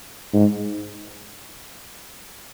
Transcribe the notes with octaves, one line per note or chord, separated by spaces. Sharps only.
G#2